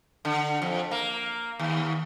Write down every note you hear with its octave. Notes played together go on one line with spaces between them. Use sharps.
D3
F2
A#3
D#2